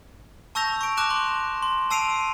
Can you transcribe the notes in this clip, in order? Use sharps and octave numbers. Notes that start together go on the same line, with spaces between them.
A5 C#6 E6 G6 A#6 F7
C#6 D7
A5 D6 F#6 A#6 E7
C6
C6
A5 E6 C7 D7 D#7 F7